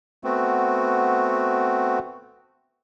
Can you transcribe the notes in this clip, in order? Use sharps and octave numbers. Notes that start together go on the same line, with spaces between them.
A3 B3 C4 F#4